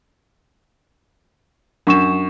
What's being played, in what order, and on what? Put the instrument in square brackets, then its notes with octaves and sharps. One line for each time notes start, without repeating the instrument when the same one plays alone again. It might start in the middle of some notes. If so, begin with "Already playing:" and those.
[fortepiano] F#2 [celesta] D4 C#6 E7